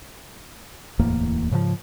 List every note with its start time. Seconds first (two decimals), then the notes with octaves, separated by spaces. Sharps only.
0.99 D1 E2 A2 A#3
1.51 G#2 C#3 E3 F3